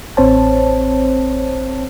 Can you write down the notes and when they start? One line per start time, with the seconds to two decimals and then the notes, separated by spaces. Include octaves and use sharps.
0.17 A1 C4 C5 C#5 A5